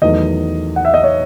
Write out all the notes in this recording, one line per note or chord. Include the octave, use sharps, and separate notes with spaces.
E2 D#3 F#3 A3 D#5
F#5
E5
D#5
C#5